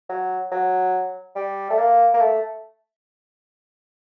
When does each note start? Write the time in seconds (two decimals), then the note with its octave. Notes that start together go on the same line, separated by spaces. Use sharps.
0.09 F#3
0.52 F#3
1.36 G3
1.70 A3
1.79 A#3
2.14 A#3
2.21 A3